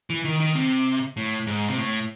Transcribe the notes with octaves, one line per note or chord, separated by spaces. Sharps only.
E3
D#3
D#3
C3
A2
G#2
C3
A2